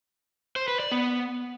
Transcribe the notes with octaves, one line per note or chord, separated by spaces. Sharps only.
C5
B4
D5
B3